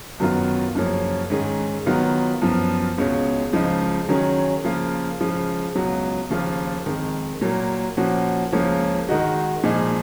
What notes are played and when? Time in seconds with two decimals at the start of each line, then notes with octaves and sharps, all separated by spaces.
0.20 F#2 D#3 F#3 B3 F4
0.75 F#2 C#3 F3 A#3 C#4
1.30 G#2 D#3 G#3 C#4 G#4
1.86 D#3 F#3 B3 F4
2.42 F#2 F3 B3
2.98 C#2 B2 G#3 C#4
3.53 C#2 C#3 F3 G#3 D#4
4.08 D#3 F#3 C#4 G#4
4.64 C#3 F3 A#3 F4
5.20 C#3 F3 G#3
5.75 C#2 B2 F#3
6.30 D#2 C#3 F3 A#3 F4
6.86 F2 D#3 G#3
7.41 A#2 F#3 A#3
7.97 A#2 F3 A#3 C#4 F#4
8.52 C#2 C#3 F3 A#3 C#4
9.09 D#3 G#3 D#4 F#4
9.63 A#2 F3 G#3 D#4 G#4